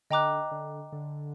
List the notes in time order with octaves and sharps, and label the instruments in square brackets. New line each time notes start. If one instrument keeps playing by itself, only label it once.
[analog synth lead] D3 [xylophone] D#5 G5 A#5 D6 F#6
[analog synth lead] D3
D3